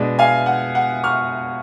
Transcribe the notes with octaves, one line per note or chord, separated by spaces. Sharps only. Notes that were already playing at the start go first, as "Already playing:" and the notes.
Already playing: B2 G#3 D4
F5 G#5
F#5
F#5
C#6 F6